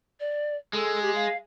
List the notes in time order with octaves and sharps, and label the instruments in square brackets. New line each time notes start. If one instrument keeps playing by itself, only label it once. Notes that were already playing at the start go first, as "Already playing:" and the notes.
[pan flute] D5
[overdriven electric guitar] G#3 [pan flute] A4
[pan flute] G4
F5